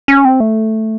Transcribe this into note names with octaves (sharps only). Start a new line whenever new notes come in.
C#4
C4
A3